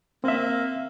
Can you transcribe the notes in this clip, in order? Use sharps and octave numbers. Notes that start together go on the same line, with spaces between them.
A#3 C4 E5